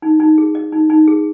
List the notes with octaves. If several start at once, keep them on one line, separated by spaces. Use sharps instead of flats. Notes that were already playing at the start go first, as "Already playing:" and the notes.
D#4
D#4
G#4
D#5
D#4
D#4
G#4